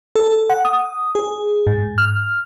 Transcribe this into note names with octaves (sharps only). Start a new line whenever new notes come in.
A4
F#5
D#6
G#4
G#2
F6